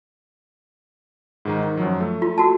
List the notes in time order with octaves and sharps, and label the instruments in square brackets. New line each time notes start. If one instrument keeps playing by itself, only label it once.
[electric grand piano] G#2 D#3 D#4
D#3
F#2 F3 F#3
A3
[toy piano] F4
F#4 A5